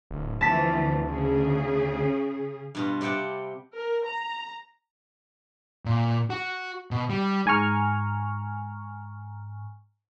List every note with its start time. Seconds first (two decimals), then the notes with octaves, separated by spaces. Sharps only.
0.11 D1
0.41 D2 E3 F3 C4 A5 A6 B6
1.08 C#3 G#4
2.75 G2 B2 F4
3.01 C3 G3 F#5 G5 A5
3.75 A#4
4.05 A#5
5.85 A#2
6.30 F#4
6.91 B2
7.10 G3
7.46 G#2 G#5 A#5 C#6 F6